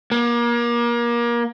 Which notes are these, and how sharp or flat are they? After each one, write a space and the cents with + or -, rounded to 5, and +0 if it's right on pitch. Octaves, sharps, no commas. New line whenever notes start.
A#3 +30